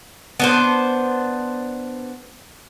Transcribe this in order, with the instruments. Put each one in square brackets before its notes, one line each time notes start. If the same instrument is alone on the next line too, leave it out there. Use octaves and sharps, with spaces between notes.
[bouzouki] B3 D4 C5